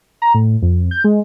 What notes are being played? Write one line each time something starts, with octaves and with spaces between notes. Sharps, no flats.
A#5
A2
F2
G6
G#3